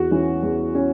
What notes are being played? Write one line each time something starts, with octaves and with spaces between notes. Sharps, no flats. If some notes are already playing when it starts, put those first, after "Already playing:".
Already playing: E2 F#4
E3 C#4
E2
C#4